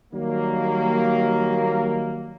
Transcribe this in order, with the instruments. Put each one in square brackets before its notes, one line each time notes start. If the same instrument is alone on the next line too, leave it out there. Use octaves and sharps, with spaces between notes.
[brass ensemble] D#3 F#3 G3 A#3